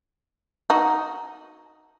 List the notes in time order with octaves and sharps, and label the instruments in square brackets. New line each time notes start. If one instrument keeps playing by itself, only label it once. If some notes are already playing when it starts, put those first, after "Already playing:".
[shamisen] D#4 F#4